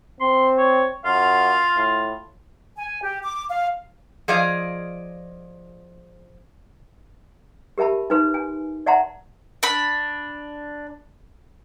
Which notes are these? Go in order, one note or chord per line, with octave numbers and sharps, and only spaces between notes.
C4 C6
C#5
F#2 F4 F5
A2
G#5
G4
D6
F5
F3 G#4 D5 D#5 F5
G4 A#4 E5 A5 B5
D#4 B4 C6
G#5
D5 E5 F#5 A5 A#5 C6
D4 B5